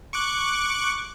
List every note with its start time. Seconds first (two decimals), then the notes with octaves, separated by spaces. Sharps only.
0.13 C#6 D6 F#6